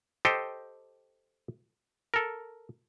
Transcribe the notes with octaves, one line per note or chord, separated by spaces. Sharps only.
G4 A4 C5 D#5 G5
A4 A#4